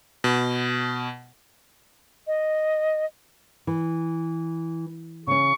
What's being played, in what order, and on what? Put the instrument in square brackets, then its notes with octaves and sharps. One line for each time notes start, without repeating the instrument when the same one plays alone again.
[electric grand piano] B2
[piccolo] D#5
[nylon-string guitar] E3
[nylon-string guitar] C#3 C#4 [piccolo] C#6